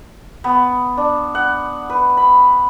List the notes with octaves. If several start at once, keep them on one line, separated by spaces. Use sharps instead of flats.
B3
D4
F#5
B4
B5